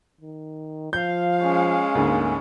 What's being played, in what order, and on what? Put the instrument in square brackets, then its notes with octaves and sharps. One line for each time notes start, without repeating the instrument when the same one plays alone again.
[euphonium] D#3
[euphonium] F3 [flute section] F5 [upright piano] G6
[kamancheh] G#3 C#4
[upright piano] D2 G#2 D3 [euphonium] A#3